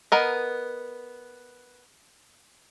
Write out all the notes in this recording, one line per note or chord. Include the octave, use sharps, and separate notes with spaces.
B3 A#4 D#5